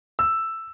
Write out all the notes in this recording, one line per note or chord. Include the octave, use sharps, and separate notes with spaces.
E6